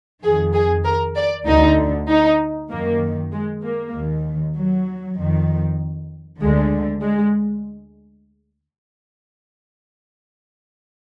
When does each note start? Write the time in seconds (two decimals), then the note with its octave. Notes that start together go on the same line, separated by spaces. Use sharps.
0.23 F2 D#3 G#4
0.54 G#4
0.85 A#4
1.16 D5
1.47 D2 D3 D#4
2.09 D#4
2.70 F#2 D#3 A#3
3.32 G#3
3.63 A#3
3.94 D#2 D#3
4.56 F#3
5.17 F2 D#3
6.41 D2 D3 G#3
7.02 G#3